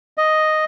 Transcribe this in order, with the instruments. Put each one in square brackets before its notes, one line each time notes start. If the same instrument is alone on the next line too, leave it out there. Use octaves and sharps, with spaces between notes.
[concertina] D#5